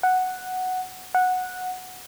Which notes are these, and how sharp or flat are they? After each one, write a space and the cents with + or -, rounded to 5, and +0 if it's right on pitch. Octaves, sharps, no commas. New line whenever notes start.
F#5 +0
F#5 -10